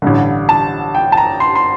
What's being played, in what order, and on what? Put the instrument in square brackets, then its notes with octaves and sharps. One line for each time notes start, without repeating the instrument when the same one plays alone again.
[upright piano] A1 G2 D3
A5
G5
A5
A#5
C6
C6